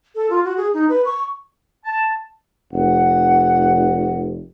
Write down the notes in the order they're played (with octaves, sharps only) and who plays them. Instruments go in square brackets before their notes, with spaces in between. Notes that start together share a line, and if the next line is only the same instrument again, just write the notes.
[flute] A4
F4
F#4
G#4
D#4
B4
C#6
[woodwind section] A5
[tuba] F1 [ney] F#5